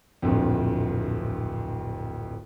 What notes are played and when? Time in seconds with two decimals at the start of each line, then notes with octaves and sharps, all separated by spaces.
0.22 D1 A#1 F2